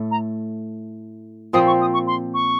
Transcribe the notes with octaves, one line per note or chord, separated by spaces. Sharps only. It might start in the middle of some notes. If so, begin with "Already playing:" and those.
Already playing: A2 A3
A#5
A#2 F3 C4 D#6
C#6
D#6
C#6
C6
C#6